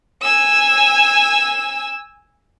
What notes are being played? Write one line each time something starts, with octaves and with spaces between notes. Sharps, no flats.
G#5 E6